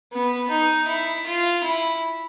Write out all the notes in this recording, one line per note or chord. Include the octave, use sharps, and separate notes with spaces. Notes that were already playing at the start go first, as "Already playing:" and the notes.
B3
D#4
E4
F4
E4